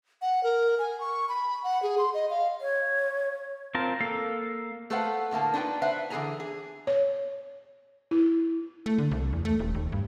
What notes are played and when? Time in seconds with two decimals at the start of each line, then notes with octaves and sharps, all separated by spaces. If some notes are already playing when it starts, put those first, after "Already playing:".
0.22 F#5
0.44 A#4
0.79 G#5
1.01 C#6
1.29 B5
1.64 F#5
1.83 G#4
1.98 C6
2.14 D#5
2.30 F5
2.61 C#5
3.75 C4 F4 A#4 A5
4.01 A#3 A4 F5
4.90 A3 A4 B4 C5 F5 F#5
5.31 A2 D3 A#3 A5
5.54 D4 D#4 F4 B4 G5
5.82 B4 C5 E5 F#5
6.10 D3 E3 E4 G#4 G#5 A#5
6.40 G#4
6.87 C#5
8.11 E4
8.86 A3
8.98 D3
9.11 C2
9.33 E2
9.45 A3
9.60 D#1
9.75 D#2
9.92 G2